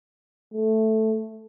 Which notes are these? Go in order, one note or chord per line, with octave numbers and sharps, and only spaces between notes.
A3